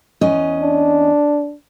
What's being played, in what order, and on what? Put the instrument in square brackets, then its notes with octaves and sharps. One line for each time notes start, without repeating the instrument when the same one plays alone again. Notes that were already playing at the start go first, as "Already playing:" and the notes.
[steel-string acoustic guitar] E2 C#4 D#5
[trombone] D4